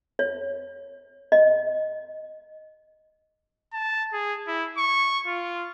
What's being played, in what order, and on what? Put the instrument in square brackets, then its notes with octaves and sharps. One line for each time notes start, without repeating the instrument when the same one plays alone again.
[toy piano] C#5
D#5
[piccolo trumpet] A5
G#4
E4
C#6
F4